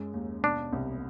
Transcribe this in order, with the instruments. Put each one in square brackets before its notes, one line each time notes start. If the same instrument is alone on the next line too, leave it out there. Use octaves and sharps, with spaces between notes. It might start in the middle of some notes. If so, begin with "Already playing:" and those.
Already playing: [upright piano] F#2 G#3
D#2
[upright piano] B2 [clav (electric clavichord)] D4
[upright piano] C2